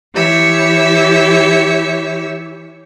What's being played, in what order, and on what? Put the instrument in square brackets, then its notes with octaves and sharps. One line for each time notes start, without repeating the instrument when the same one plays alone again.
[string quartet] E3 G4 C#5 E5